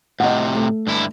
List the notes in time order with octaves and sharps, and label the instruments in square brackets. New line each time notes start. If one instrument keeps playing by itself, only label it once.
[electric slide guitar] A2 C3 [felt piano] D#5 F#5
[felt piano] A3
[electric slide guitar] G2 D3 E4